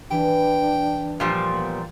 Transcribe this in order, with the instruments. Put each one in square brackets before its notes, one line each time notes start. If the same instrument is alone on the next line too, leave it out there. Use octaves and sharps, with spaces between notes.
[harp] E3 [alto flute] D4 [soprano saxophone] G5
[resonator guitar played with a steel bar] A#2 F3 G3
[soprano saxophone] B3